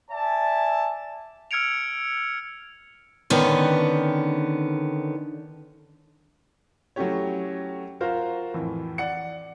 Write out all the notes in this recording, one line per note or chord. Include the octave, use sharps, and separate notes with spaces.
D5 E5 G#5 A5
E6 F6 G#6 C#7 D7 F7
D3 D#3 B3 C#4 B4
F#3 A3 C#4 E4 G4 C#5
F4 F#4 A#4 C5 F5
F2 A2 E3
D5 F#5 C#7